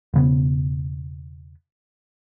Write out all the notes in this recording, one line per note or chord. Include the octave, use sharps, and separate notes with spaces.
E1 C#3 B3